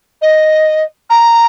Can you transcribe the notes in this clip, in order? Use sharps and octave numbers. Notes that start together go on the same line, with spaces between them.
D#5
A#5